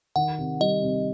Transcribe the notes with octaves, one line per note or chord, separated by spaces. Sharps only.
D#3 F#5
C3
G3 D#5
C3